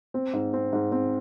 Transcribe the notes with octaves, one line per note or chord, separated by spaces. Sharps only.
C4
G#2
C4
G#2
C4